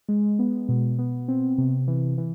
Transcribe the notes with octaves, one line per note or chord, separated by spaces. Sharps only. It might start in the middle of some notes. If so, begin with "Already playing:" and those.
G#3
B3
B2
B3
C4
C3
E3
E3